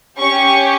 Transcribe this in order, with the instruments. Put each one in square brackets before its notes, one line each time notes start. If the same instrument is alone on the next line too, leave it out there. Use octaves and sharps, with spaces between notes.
[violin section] C#4 G4 C#6